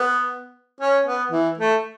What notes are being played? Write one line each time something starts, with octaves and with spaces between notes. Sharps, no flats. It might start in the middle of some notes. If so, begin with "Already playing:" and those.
Already playing: B3
C#4
B3
E3
A3